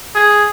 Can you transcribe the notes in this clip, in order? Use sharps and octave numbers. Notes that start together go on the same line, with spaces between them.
G#4